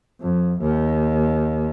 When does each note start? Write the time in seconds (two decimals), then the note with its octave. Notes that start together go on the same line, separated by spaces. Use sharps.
0.21 F2
0.61 D#2